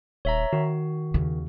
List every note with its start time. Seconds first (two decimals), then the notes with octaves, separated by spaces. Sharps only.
0.25 D#1 C#5 E5 A#5
0.53 D#3 F#4
1.14 D#2 C#3